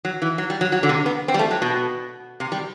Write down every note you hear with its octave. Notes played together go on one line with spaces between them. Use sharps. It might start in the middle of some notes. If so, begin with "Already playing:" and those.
F#3
E3
F#3
G3
F#3
F#3
D3
C3
B3
C4
G3
A3
F#3
B2
C3
G3